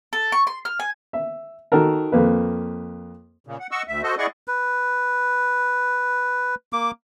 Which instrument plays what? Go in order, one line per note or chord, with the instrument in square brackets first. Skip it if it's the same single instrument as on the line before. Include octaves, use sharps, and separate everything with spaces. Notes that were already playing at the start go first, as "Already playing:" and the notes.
[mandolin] A4
C#6
C6
F6
G#5
[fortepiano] E5
D#3 F#4 A4 A#4
F2 A#3 B4
[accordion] A#2 C#3
F#5
D#5 F#5 C#6 E6
D2 E5
F#4 A4 C5 D#5
E4 G#4 D5 D#5 F#5 C#6
[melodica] B4
A#3 D6